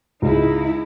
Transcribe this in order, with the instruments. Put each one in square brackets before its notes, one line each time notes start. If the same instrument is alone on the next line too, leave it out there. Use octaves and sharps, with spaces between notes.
[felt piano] C#2 [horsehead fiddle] D#4 E4